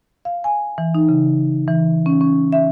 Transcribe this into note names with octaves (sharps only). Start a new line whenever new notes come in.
F5
G#5
E3
D#4
C#3
E3
C#4
C#4
E5